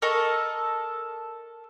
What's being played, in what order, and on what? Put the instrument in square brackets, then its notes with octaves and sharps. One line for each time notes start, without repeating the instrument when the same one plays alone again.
[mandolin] A4 A#4 D#5 C#6